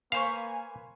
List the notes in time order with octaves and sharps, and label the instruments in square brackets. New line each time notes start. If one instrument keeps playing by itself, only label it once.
[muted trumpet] A#3 [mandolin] B4 C5 C#6 [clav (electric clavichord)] F5 [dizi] G#5